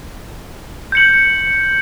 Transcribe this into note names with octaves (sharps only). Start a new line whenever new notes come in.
G6 C#7 F#7